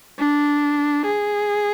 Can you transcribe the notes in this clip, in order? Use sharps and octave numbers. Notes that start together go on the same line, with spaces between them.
D4
G#4